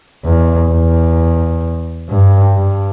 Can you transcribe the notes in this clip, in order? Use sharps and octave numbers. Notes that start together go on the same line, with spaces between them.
E2
E2
G2
G2